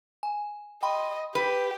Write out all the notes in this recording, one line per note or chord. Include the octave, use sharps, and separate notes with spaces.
G#5
D#5 G5 B5 C6
G4 B4